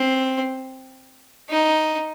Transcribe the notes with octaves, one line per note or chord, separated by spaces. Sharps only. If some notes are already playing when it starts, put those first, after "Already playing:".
Already playing: C4
D#4